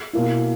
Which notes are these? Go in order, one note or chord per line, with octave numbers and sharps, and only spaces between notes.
B2 A#3 E4